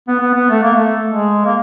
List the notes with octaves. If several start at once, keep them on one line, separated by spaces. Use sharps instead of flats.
B3
B3
B3
A3
A#3
A3
G#3
A#3